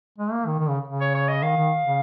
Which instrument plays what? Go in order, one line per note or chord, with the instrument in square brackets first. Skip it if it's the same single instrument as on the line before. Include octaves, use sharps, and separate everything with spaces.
[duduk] G#3
A#3
D#3
D#3
C#3
C#3
[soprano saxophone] C#5
C#5
D#5
[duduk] D#3 [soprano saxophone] F5
[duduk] D#3
C#3